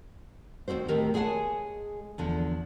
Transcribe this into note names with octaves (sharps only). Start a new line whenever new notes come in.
D#2 G#2 C4 F#4 C5
D#2 A2 D#3 G4 A#4
G#3 G#4 C#5 F#5 G#5 A5
E2 D3 F3